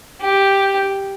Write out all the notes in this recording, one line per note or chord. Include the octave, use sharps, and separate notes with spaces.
G4